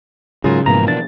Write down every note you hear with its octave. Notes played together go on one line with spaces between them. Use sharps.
G#2 C#3 F#3 F4 G#4 A#4
G#2 B2 E3 F3 A#3 A#5
D4 A6